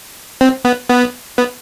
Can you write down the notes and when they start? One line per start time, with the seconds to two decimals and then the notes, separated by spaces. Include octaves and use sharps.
0.41 C4
0.65 B3
0.89 B3
1.38 B3